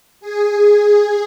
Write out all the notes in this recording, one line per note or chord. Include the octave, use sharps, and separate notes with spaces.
G#4